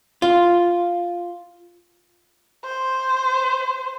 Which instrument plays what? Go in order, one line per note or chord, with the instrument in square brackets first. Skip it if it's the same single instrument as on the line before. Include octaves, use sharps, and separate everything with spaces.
[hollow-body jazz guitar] F4
[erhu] C5